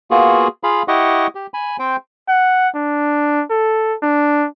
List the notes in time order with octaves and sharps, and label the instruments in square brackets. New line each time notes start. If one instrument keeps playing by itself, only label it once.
[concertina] A#3 B3 F4 F#4 G#4
F4 G#4 F5 B5
E4 G4 D#5 F#5 C#6
G4
G#5 B5
C4 C5 G5
[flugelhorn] F#5
D4
A4
D4